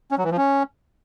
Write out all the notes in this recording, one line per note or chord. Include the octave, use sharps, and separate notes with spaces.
C#4
F#3
E3
F3
C#4